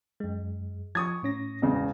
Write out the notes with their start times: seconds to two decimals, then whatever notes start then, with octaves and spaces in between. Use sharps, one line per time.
0.20 F#2 G#3
0.95 F3 C#6 D#6 G#6
1.23 A2 C#4 A#6
1.62 E1 C#3